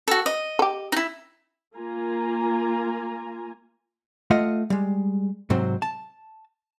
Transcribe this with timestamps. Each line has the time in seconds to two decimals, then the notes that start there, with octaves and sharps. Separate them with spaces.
0.08 F#4 A4
0.26 D#5
0.59 G4 A4
0.92 D#4 E4
1.76 A#3 F4 G#5 A#5
4.30 A3 F4 D#5 F#5
4.70 G3 G#3
5.50 G#2 C3 F#3 C4
5.82 A5